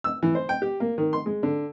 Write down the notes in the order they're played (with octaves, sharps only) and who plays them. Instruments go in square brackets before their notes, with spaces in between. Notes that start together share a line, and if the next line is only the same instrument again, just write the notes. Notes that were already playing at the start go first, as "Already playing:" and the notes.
[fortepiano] E6
E3
C5
G5
G4
A#3
D#3
C6
G#3
D3